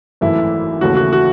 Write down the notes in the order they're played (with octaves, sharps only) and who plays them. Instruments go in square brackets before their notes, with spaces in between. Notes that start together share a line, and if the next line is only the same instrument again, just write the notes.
[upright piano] G#1 F#2 E3 A3 E4
D#2 C#3 E3 A3 F#4
F#4
F#4